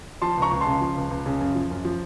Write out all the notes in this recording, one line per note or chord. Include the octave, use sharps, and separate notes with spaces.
F3 A5 C6
C#2 A#5 C#6
C#2
A5 C6
C#3
F3
C#2
C#2
C#3
F#2
F3
F#2
F3